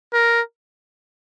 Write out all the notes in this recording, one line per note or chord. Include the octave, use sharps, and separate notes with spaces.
A#4